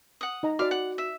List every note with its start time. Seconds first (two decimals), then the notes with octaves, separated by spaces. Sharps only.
0.21 F#5 D#6
0.43 D#4 D#5 A#5
0.59 F#4 D5 D#5 F5 D6
0.71 F#5
0.98 E5